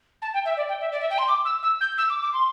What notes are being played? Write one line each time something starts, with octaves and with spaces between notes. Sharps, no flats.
A5
G5
E5
D5
G5
E5
D5
E5
G5
C6
D6
E6
E6
G6
E6
D6
D6
C6